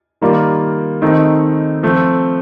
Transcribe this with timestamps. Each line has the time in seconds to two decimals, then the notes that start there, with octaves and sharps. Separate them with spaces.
0.21 D#3 G3 A#3 F4
1.02 D#3 A3 C4 D#4
1.83 F3 A3 C4